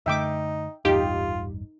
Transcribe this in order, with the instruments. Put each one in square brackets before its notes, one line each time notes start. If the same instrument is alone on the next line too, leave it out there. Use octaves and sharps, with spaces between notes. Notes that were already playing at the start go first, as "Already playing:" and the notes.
[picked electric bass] F#2 D3 A3 [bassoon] D#4 [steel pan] E5 G5 D6
[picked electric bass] A1 E2 G2 [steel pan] D#4 [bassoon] F4 [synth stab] G4